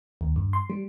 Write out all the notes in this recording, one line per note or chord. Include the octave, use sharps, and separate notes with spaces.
D#2
G2
C6
G3